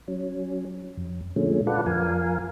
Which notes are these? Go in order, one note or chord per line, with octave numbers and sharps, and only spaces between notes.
F#3 C#4
F2
A#2 D3 F3 G#3 A3 C#4
F4 A4 B4 D5 F#5
F2 F3 A#4 F5 G#5